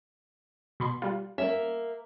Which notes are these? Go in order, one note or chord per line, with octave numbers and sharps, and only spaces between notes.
B2 B5 C6
G3 F4
A#3 C#4 E5